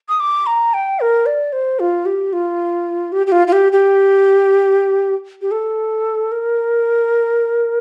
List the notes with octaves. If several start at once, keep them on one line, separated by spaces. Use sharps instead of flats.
D#6
D6
A#5
G5
A#4
D5
C5
F4
G4
F4
G4
G4
F4
F4
G4
G4
G4
A4
A#4